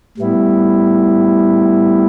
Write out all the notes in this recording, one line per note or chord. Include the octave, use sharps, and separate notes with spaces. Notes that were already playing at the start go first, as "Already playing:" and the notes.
A2 G3 B3 E4